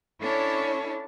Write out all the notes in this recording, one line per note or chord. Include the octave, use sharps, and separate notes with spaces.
C#4 D4 E4 A4 C#5 A5